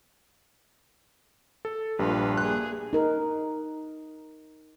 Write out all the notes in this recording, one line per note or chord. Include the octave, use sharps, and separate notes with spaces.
A4
A#1 G2 F4 B4
A#3 G#4 F#6
D#4 A#4